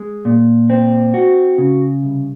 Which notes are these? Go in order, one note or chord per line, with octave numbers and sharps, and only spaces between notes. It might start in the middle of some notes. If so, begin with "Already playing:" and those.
Already playing: G#3
A#2
C4
F#4
C#3
C2